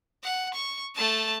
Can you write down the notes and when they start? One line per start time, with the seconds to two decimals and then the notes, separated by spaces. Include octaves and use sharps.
0.24 F#5
0.54 C#6
0.96 A3 A5